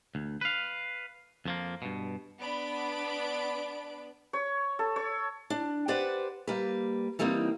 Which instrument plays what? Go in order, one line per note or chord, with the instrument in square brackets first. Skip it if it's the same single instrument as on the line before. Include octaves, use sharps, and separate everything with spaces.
[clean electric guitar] D2
B4 F5
F2 F3 A#3
G2 B2
[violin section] B3 D4 B5 D7
[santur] C#5
A4
C#5
[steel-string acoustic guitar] D4
G4 B4 C5 D5 F#5
G3 A#3 B4
E3 G3 A#3 C4 D#4